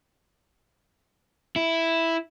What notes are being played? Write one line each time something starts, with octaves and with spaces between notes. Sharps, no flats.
E4